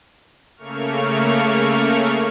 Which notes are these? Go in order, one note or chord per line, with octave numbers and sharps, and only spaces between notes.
C#3 A3 A#3 C#6 F6